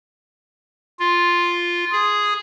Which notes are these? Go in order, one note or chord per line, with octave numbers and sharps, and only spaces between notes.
F4
G#4